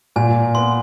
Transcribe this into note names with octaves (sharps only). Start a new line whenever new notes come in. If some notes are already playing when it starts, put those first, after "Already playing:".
A#2 G#5
B3 C6